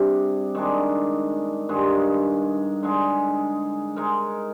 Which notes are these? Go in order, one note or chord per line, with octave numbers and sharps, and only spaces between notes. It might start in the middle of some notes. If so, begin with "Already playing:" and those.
Already playing: C3 G3 D4 G#4
D#3 G#3 D4
G2 D#3 G#3
D3 G#3 D#4 G#4
G#3 D#4 A#4